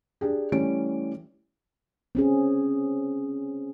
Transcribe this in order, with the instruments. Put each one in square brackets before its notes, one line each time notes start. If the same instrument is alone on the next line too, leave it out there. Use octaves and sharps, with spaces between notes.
[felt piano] D4 G4 G#4
E3 G3 A3 C#4 D7
[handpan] C4 C#4 G#4